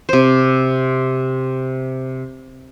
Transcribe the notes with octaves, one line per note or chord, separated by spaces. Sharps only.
C3 C5